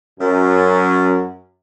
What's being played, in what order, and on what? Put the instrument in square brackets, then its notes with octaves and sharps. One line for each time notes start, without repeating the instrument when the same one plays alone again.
[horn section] F#2